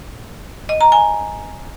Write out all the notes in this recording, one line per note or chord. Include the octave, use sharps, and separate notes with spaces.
D#5
A#5
G#5